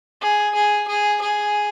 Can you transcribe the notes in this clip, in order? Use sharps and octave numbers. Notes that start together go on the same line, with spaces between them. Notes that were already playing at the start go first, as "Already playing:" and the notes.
G#4
G#4
G#4
G#4